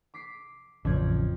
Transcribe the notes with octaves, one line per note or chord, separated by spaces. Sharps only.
D6 B6 C7
A1 F2 C#3 D5 G#6